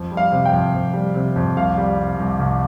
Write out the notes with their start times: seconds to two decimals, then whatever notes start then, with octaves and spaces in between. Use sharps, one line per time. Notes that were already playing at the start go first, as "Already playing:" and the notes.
Already playing: F2
0.11 G3
0.17 F5
0.32 C3
0.45 G5
0.53 F2
0.74 F2
0.93 G3
1.15 C3
1.36 F2
1.57 C2 F5
1.77 G3
1.98 C3
2.18 C2
2.40 C2